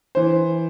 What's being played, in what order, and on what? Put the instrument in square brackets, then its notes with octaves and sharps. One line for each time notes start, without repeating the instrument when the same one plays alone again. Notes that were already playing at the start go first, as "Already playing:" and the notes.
[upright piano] E3 C5